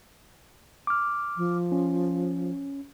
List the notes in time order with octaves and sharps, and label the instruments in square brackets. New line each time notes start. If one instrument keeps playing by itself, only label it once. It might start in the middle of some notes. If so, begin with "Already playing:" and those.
[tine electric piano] D6 F6
[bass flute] F3
[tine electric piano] C#4